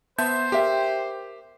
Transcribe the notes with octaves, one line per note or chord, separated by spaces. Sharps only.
B3 C5 E5 A5 G6
G4 A#4 E5 G5